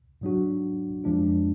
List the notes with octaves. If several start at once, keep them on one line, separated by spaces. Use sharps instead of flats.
G#2 F#3 D4 F#4
F2 F3 G#3 D4 F4